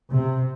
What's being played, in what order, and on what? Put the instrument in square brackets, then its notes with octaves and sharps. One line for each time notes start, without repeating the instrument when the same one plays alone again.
[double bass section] C3